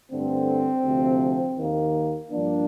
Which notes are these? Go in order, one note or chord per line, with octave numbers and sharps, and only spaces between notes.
G2 D3 A3 C4
D2 C3 F3
D#2 D#3 A#3
G2 F3 A#3 D4